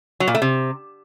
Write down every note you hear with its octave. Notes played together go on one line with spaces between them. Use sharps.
F#3
A#2
A3
C3